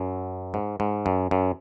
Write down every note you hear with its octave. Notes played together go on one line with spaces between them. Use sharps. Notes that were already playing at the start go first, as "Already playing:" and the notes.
Already playing: F#2
G#2
G#2
F#2
F#2